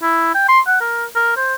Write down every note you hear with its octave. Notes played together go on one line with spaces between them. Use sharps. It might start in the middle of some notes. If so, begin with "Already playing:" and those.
E4
G5
C6
F#5
A#4
A#4
C5